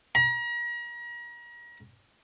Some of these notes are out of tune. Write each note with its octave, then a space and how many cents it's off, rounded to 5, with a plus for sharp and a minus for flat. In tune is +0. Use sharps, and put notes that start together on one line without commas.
A#5 +40